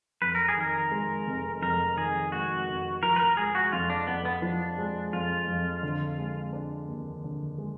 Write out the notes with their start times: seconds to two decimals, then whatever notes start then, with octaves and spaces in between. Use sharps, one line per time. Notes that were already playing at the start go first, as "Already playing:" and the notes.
0.22 F2 B4
0.35 A#4
0.48 G#4
0.57 D#3 A#4
0.91 G#3
1.27 F1
1.62 F2 A#4
1.97 D#3 G#4
2.32 G#3 F#4
2.68 F1
3.02 F3 A#4
3.16 B4
3.20 A#4
3.37 G#3 G#4
3.55 F#4
3.72 F2 F4
3.90 D4
4.07 F2 B3
4.25 B3
4.42 F3 D4
4.78 G#3
5.13 F2 F4
5.48 F2
5.83 D3
6.18 G#3
6.53 D4
6.88 D#2
7.24 D3
7.58 G#3